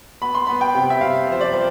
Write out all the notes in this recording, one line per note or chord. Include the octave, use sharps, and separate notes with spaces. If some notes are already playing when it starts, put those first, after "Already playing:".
B3 B5
C6
B3 B5
G5
C3
E5
C3 F5
F3 C5
D5
F3